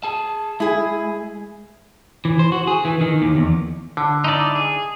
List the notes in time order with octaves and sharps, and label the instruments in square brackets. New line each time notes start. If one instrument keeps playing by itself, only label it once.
[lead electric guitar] G#4 A5
[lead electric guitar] G#3 [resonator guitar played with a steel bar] E4 G#4
[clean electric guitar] E3
C5
F#4
G#4
E3
D#3
D#2
E2
[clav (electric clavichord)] D3
[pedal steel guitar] D#4 E4 D5
G#4